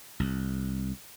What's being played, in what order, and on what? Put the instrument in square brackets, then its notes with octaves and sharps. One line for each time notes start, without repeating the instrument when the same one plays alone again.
[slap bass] C2